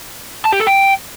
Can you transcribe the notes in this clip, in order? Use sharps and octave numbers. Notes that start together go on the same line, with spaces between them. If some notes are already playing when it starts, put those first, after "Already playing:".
A5
G4
A4
G5